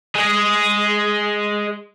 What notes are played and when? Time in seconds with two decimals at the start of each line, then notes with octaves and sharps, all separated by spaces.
0.16 G#3 G#4